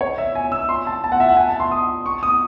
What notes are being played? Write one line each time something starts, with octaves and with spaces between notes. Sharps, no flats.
C#5
E5
G#5
E6
C6
A5
A5
F#5
E5
F#5
G#5
A5
C6
D#6
C#6
D#6